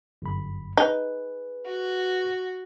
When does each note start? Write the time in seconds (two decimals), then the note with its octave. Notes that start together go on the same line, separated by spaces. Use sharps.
0.22 G1 F#2 B5
0.77 D#4 G#4 B4
1.65 F#4